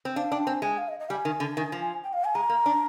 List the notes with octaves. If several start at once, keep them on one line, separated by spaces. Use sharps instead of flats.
C4
D4 F5
D4 G5
C4 G#5
G#3 G#5
F5
D#5
D#5
G3 G#5
D#3
D3
D#3
F3
G5
F5
G#5
G#3 A#5
A#3
D4